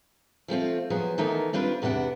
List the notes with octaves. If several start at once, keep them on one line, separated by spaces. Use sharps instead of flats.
F3 A3 C4 F4
F3 F#3 B3 G#4
D#3 E3 A3 B3 D#4 A#4
G3 C4 D4 F4 B4
E2 C3 B3 D4 F#5